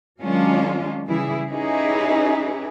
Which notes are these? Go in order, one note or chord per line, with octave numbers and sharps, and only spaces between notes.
D#3 F#3 G#3 C#4 D4 F4
C#3 E3 G3 E4 G#4
C#4 D#4 E4 G4 G#4 B4